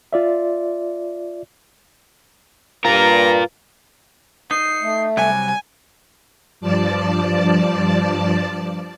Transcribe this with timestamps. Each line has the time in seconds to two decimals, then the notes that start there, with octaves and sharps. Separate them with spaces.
0.13 F4 D5 E5
2.85 G2 F4 A#4 B4 A#5
4.51 D#4 C7
4.82 A3
5.17 C3 F#3 G3 G#5
6.61 G2 F3 D5 A5